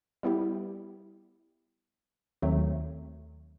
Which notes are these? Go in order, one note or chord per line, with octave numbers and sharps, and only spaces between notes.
G3 B3 E4 G4
D#2 D#3 F#3 A3 C4